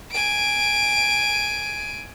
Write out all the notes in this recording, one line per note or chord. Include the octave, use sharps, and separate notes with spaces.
G#5 D7